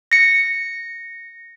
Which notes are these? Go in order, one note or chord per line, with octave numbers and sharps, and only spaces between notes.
A#6 C#7